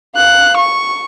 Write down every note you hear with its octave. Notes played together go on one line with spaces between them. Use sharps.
F5 F#6
C#6